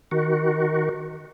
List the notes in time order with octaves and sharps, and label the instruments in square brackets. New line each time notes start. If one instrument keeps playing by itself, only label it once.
[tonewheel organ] D#3 F#4